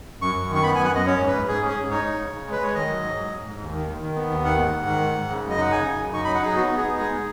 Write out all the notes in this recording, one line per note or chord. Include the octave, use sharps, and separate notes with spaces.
F#2 C#6
F#2
D#3
C#6
B3 B5
F#2 G#5
F#5
F#2 D#5
C#4 C#5
G#2
B4
G#2
G#2 G#4
C#4
G#4
G#2
D#4 C#5
D#4
C#3
C#3
G#3
B4
G#3 C#5
D#3 D#5
F#3
G#2
F#3
G#2
G#2
D#2
D#3
D#3
D#3
B3
D#2
D#3 F#5
G#2
G#2
D#3
G#2
G#2
C#3
F#2
D#5
D#4 F#5
C#3 G#5
C#3
F#2
D#4 C#6
F#3 B5
F#5
D#4 G#4
B3 F#4
B3
G#4
D#4
G#3 G#4
G#3